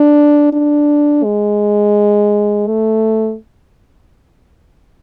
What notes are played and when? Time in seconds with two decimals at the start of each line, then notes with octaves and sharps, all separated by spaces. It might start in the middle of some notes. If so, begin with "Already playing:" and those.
Already playing: D4
0.53 D4
1.24 G#3
2.67 A3